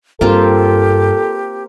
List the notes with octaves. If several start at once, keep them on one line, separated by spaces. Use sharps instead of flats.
G2 A#3 C4 F4 G4 A4